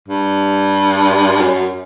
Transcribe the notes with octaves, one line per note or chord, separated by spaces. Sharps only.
G2
F#2